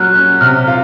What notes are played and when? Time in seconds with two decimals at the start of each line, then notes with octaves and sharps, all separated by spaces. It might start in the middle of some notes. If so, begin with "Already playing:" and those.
Already playing: A#2 F#3 F#4 F6 F#6
0.15 C#4
0.41 C3 F6
0.67 F4